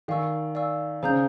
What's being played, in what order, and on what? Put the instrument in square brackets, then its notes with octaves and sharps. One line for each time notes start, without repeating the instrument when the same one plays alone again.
[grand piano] D#3 [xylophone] D5 F5 G#5 C#6 E6
[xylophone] D5 F5 G#5 C#6 E6
[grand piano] C#3 [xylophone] C5 F5 A#5 D#6 G6